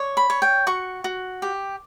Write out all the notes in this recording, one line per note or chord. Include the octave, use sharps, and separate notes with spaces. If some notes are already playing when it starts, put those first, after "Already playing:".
Already playing: C#5 D5
B5
C#5
G5
F#4 C#6
F#4
G4